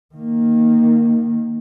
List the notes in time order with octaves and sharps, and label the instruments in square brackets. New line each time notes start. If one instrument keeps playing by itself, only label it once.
[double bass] D#3 A#3